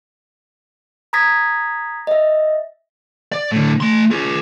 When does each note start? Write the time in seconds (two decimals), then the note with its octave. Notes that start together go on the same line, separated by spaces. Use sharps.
1.13 A#5 B5 D#6 G#6 A#6 B6
2.07 D#5 E5
3.32 D5
3.52 A2 D3
3.80 A3 C6
4.11 F4 G#4